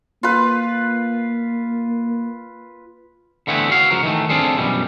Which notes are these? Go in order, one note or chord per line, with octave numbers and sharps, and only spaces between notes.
A#3 F4 B4
D3 E3 A3 B3 C4 E4
F#4 F5
C#2 F3 F#4 A#4
D#3 E3 A3
C4 D4 F4 G#4 A4
F#2 B2 E3 G3